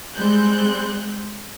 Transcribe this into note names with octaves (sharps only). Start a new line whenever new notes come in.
G3 G#3 C4 F#6 G6